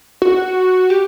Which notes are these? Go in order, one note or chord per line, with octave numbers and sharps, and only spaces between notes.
F#4
G4